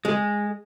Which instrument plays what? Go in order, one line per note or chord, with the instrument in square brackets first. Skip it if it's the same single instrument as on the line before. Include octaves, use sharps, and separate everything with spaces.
[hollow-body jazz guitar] G#3